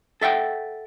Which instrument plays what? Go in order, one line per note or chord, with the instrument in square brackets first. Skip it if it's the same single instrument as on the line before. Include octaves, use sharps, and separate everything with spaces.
[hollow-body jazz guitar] A4 E5 F#5 G5